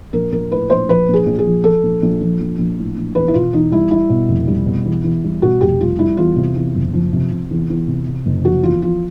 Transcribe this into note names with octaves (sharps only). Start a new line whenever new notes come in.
A#1 A#4
A#1 A#4
A2 B4
A#1 C5
F3 B4
A#1
G#4
A#1
G#4
F3
F3 A4
A#1
A#1
F3
A#1
A#1
A2
A#1
E2 B4
E4
B2 F4
E2 D#4
G3 E4
G3 E4
B2
F1
G3
B2
E2
E2
G3
B2 F#4
F1 G4
G3 F4
G3 E4
E2 F4
C3
E2
F#1
F3
C3
C3
E2
E2
C3
C3
F#1
F3 F#4
E2 F4
F3 F4